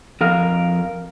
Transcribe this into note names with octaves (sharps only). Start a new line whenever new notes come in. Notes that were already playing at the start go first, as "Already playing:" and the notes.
F2 A#4 F5